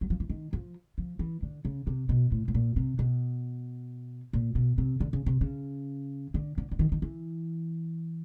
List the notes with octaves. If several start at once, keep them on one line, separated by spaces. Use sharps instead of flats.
F#3
F3
E3
D#3
F3
F3
E3
D3
C#3
C3
B2
A2
A2
A#2
C3
B2
A#2
B2
C3
D3
C#3
C3
C#3
D3
D3
D3
D#3
D#3
E3